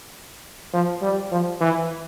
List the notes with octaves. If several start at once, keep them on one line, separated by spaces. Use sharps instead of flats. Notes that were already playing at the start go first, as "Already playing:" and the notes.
F3
G3
F3
E3